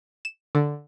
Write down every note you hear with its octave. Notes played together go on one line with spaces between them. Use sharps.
E7
D3